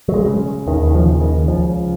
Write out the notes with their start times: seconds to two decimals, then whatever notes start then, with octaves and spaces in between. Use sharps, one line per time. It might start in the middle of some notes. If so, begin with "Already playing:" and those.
0.08 F#3
0.14 G#3
0.26 C#3
0.67 D#2 D#3
0.84 D#3
0.95 F3
1.08 C#3
1.21 D#3
1.48 C#2 F3